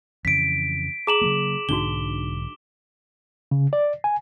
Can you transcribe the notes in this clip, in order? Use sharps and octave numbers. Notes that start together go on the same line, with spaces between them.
F2 C#3 E3 B6 D7
G#4 A5 A#5 D6 E7 F#7
C#3 F#3 A#3
B1 G#2 D3 D4 D#4 F#4 G7
C#3
D5
G#5